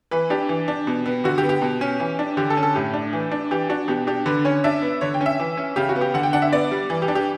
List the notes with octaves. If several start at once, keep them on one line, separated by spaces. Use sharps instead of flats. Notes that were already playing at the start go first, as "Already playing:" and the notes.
E3 B4
D4 G4
E3
D4
B2
B3
D3 F#4
G4
B3
G4
B2
C#4
E3
D4
D3 G4
A4
C#4
A4
A2 G4
D4
E3
D4
E3 G4
D4 F#4
B2 G4
D4 G4
D3 B4
C#4 C#5
D4 E5
B3
D3 C#5
G5
C#4
E5
E3
C#4
C#3 G4
F#4
B3
G4
D3 F#5
G5
D4 F#5
E5
B3 D5
G3
E3
G4
D4
G4